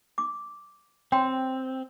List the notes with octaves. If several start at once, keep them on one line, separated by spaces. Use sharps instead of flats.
D6
C4 C#5 G5 C6